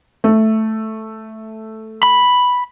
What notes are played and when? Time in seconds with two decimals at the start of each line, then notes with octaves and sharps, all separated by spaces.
0.24 A3
2.03 B5